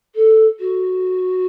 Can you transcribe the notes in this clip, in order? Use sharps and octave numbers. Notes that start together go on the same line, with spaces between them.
A4
F#4